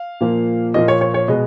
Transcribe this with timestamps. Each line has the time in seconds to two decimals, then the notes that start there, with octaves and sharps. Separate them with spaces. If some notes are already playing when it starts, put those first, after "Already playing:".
Already playing: F5
0.21 A#2 F3 A#3
0.74 A#2 F3 A#3 D#5
0.88 C#5
1.01 C#5
1.14 C#5
1.28 B2 G#3 B3 D#5